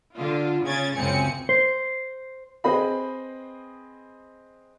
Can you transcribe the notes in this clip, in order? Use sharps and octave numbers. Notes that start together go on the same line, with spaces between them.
D3 F4
C#3 C#4 G#6 A6
C#2 F#2 C#3 C4 G#5 C#7
C5
C4 G#4 B4 C5 D#5 B5